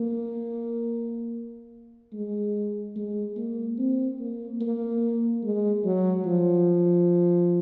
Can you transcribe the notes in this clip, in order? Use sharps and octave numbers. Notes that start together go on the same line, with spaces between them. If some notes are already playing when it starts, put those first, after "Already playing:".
Already playing: A#3
G#3
G#3
A#3
C4
A#3
A#3
G#3
F#3
F3